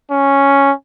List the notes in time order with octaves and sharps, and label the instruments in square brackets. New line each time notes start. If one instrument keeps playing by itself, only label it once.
[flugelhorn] C#4